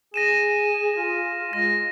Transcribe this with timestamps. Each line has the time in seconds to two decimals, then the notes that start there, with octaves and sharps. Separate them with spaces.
0.14 G#4 A#6 D#7 E7
0.96 F4
1.53 G#3 A#6